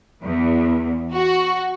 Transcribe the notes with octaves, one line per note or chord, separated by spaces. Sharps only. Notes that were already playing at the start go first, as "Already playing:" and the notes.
E2
F#4